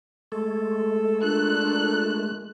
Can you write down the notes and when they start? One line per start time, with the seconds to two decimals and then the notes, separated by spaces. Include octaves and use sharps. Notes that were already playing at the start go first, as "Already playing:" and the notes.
0.32 G#3 A3 A4
1.22 D4 F4 A4 A#4 F#6